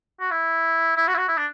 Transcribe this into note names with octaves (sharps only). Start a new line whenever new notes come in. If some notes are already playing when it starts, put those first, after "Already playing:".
F#4
E4
E4
F#4
E4
F#4
E4
D4